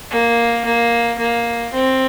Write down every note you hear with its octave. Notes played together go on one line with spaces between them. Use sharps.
A#3
A#3
A#3
C4